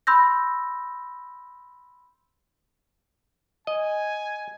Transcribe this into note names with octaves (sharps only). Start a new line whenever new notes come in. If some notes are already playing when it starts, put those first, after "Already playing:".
B5 C6 E6 G6 A#6
D#5 G#5